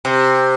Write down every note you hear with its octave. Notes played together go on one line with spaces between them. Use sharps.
C3